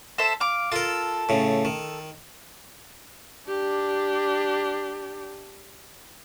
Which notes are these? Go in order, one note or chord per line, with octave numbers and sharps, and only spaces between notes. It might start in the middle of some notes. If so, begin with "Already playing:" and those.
A4 C5 E5
F5 D6
F4 A4 A#4
A2 C#3
D#3
D4 G4